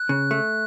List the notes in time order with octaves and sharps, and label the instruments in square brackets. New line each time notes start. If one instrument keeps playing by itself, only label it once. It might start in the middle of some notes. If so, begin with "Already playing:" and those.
Already playing: [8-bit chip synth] F#6
[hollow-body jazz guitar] C#3
A3